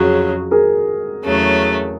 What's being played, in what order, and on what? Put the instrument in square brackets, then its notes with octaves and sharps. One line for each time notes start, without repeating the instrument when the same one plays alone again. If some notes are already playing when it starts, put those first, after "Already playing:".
Already playing: [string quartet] F2 C#3 F#3 [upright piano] F#4 G#4
[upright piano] G#4 A#4
[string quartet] E2 C#3 F#3 A3